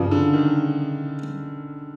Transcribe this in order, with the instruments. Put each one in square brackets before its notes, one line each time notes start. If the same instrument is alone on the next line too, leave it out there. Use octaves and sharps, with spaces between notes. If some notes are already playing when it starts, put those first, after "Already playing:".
Already playing: [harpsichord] G2 F3 [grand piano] C#3
[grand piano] D3
D#3